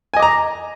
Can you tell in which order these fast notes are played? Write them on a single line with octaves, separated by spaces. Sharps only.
G#5 D#5 D6 A#5